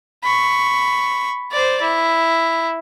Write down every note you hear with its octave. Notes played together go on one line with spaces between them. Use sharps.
B5 C#6
C5 D5
E4